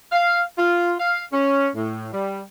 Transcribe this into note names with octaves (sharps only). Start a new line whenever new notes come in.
F5
F4
F5
C#4
A2
G3